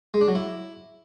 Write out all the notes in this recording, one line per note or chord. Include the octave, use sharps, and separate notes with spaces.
G#3
D4
F#3
E4